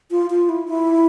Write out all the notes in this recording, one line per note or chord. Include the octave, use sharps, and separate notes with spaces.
F4
F4
E4
E4